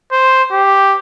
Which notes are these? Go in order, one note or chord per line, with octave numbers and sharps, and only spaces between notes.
C5
G4